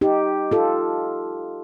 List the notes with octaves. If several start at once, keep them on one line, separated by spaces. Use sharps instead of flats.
D#4 G4
F4 A4